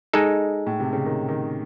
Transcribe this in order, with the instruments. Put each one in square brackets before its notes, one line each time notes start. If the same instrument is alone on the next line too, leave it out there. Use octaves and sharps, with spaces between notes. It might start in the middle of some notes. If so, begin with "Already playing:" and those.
[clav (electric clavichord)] G#3 D#4 A4
[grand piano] A2
C3
C#3
D#3
D#3